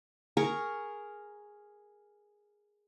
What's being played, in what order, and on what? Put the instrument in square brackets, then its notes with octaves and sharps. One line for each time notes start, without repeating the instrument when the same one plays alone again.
[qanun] G#4 A#4 C#6